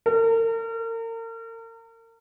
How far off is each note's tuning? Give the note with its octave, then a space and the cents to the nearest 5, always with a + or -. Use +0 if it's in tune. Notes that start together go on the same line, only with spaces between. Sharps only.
A#4 -40